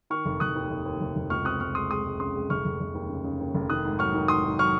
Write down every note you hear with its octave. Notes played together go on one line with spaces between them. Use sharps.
D#3 C#6 F6
F1
F1 D#6 F#6
D#2
F1
D#2
F1
F1
C#2 C#6 F6
C4 D#6 F#6
C#2 C#6 F6
G#3 C6 D#6
G#3 C6 D#6
G#3
C#3 C6 D#6
G#3
F1 C#6 F6
F1
F1
D#2
C#3
C#3
D#2
F1
D#3 D#6 F#6
G#2
F#3 C#6 F6
D#3
G#2 C6 D#6
D#3
F#3 C#6 F6